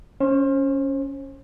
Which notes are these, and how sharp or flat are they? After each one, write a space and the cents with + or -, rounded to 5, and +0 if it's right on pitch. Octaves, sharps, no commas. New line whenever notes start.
C#4 +0 C5 +35